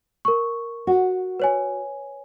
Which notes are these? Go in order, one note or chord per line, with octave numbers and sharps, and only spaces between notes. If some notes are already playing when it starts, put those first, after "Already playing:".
A#4 C#6
F#4
B4 C#5 G#5